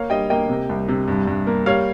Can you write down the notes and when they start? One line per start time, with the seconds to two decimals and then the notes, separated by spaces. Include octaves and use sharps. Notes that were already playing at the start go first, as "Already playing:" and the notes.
Already playing: A#3 C#5 F5
0.10 G3 D#5 G5
0.30 A#3 D#5 G5
0.49 C3
0.69 C2
0.88 C3
1.08 G2
1.28 G2
1.47 A#3
1.66 G3 C#5 F5